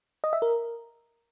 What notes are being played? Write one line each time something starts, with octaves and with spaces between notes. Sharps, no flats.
D#5
E5
A#4